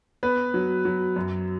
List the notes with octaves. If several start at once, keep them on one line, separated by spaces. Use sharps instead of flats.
B3 B4
F#3
F#3
F#2